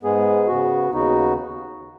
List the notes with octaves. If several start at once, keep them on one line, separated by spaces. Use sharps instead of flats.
G#2 G#3 B3 G#4
C#3 B3 F#4
D#2 C#3 B3 D#4 F#4